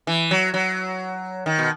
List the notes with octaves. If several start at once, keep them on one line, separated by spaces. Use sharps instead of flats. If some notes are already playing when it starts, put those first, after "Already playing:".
E3
F#3
F#3
D#3
B2